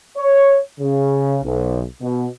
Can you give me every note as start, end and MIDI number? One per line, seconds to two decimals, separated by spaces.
0.18 0.59 73
0.80 1.38 49
1.44 1.82 35
2.02 2.27 47